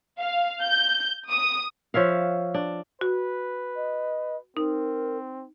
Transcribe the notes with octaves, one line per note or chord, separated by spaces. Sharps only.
F5
G6
D#6
F3 C#5 E5 F5
D4
F#4 B4
D#5
C4 D#4 A#4